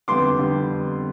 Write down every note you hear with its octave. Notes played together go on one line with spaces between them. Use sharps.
F2 D3 G3 B3 C6 D6
D3 G3 B3